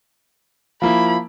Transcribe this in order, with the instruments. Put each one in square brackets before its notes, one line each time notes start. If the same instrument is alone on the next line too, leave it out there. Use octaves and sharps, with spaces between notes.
[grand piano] F3 A#3 E4 [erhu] B5